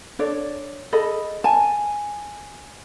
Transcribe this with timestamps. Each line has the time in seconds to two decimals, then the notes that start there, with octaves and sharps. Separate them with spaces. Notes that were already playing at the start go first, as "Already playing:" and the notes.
0.19 D4 A4 C#5 D5
0.92 G#4 A4 D#5 B5
1.44 G#5 A5